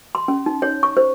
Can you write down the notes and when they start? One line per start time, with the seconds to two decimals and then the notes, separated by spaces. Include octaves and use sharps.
0.15 C6
0.28 C#4
0.46 D#4
0.62 C#5
0.83 C#6
0.97 C5